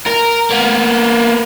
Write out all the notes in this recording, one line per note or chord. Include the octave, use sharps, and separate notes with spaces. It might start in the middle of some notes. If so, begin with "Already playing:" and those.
A#4
A#3 B3